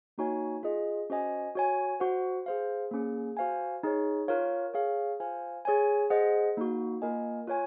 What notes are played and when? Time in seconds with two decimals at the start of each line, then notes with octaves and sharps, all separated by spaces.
0.18 A#3 D#4 F#4 C#5 G#5
0.63 F4 G#4 D#5
1.10 C#4 F#4 C5 D#5 G#5
1.55 F#4 C#5 G#5
2.00 F#4 C5 F#5
2.46 G#4 C5 F5
2.91 A#3 C#4 G#4
3.37 F#4 C5 F5 G#5
3.83 D#4 G#4 C#5
4.28 F4 A#4 C#5 F5
4.74 G#4 C#5 F5 G#5
5.20 F4 C5 F5 G#5
5.65 G#4 C#5 G#5
6.10 G#4 C5 D#5 F#5
6.57 A#3 D#4 F#4
7.02 A#3 F4 A#4 D#5 G#5
7.47 F4 A#4 C#5 G#5